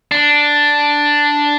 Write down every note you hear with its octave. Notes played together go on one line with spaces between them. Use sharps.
D4